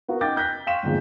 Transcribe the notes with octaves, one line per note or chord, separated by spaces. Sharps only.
B3 F#4 A#4
C#4 D#4 G5 D6 G6 A6
F#6 G6 A#6 B6
F5 G5 C6 C#6 B6 E7
A#1 E2 G#2 D3 G#3